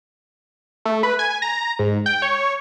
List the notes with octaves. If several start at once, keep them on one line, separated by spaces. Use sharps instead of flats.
A3
B4
G#5
A#5
G#2
G5
C#5